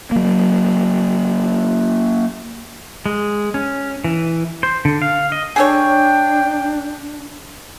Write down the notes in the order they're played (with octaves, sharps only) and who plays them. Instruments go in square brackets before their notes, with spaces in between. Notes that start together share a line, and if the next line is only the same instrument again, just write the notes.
[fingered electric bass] F#3 A#3
[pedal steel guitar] G#3
C#4
E3
C5
D3
F5
D#5
[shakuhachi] D4 [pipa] G#4 A4 C#5 [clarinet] G5